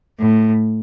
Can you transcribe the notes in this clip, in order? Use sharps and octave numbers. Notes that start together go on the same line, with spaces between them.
A2